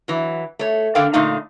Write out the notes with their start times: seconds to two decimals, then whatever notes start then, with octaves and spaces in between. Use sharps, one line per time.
0.08 E3 F#3
0.59 A3 C#5
0.95 D3 D4 A4 A#4 F5 G5
1.13 A#2 D3 A3 D#4 D#5 F5